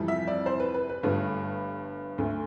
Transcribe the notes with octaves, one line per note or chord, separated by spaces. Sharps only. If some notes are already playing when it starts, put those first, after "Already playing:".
Already playing: F2 C3 E3 G3
E5
D5
C5
B4
B4
B4
G1 G2 D3 A3 B4
D2 D3 A3